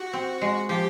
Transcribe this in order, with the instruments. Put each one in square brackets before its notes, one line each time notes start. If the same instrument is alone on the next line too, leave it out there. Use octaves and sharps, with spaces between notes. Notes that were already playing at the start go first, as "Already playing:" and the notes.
Already playing: [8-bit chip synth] F#4
[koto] C4
G#3
[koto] F3 [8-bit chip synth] G4